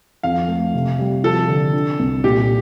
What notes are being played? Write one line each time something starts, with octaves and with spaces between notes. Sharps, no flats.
F2 F5
A3
C3
G3
F3 A4
D3
D4
C2
A#2 G4